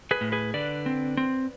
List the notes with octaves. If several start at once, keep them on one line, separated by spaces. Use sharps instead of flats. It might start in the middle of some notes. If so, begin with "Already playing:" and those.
G#4 B4
A2
G#4 B4
D3 B4 D5
C4
C4